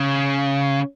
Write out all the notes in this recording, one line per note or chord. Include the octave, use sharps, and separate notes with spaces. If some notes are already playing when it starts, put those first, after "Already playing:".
Already playing: C#3